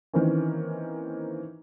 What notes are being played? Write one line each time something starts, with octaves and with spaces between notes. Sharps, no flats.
D#3 E3 A#3 C4 C#4